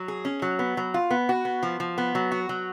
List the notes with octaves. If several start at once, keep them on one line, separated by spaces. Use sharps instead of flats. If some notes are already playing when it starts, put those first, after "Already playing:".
Already playing: F#3
G#4
C#4
F#3
B3
F#3
F4
B3
F#4
B3
F3
F3
B3
F#3
F#4
F#3